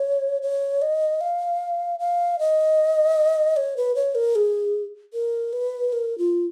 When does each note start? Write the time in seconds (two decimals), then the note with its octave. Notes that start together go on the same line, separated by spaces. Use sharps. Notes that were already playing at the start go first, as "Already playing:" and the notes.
Already playing: C#5
0.42 C#5
0.82 D#5
1.21 F5
1.99 F5
2.39 D#5
3.57 C#5
3.77 B4
3.95 C#5
4.15 A#4
4.35 G#4
5.14 A#4
5.53 B4
5.93 A#4
6.18 F4